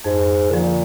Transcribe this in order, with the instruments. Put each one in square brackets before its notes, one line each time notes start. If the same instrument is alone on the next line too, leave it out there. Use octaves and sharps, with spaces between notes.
[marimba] F2 [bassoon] G#2
[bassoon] A#2 [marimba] D3 F3